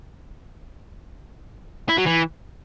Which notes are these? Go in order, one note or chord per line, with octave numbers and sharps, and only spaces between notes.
E4
F#3
E3